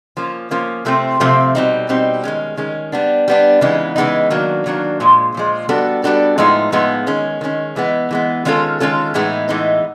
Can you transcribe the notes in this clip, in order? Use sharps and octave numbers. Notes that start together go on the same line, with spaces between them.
F3 A#3 C#4
F3 A#3 C#4
C3 F3 A3 C4
C3 F3 A3 C4
B2 G3 C4 D#4
B2 G3 C4 D#4
D#3 G#3 C#4
D#3 G#3 C#4
G3 B3 D4
G3 B3 D4
C#3 E3 G#3 B3 D#4
C#3 E3 G#3 B3 D#4
D#3 F#3 A#3 D4
D#3 F#3 A#3 D4
A#2 F3 G#3
A#2 F3 G#3
G3 B3 D4 F#4 A4
G3 B3 D4 F#4 A4
A2 F3 G#3 B3 D#4
A2 F3 G#3 B3 D#4
D#3 G#3 C#4
D#3 G#3 C#4
E3 G#3 B3
E3 G#3 B3
D#3 G#3 C#4 F4 A4
D#3 G#3 C#4 F4 A4
A2 E3 G#3 B3 D#4
A2 E3 G#3 B3 D#4